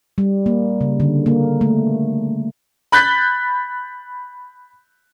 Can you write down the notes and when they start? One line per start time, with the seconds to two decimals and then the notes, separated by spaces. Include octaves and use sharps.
0.18 G3
0.46 A#3
0.81 C#3
1.00 D3
1.26 A#3
1.61 A3
2.92 B5 F#6 G6 A6 B6